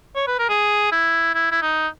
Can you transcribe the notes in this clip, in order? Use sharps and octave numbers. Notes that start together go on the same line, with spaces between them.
C#5
B4
A#4
G#4
E4
E4
E4
D#4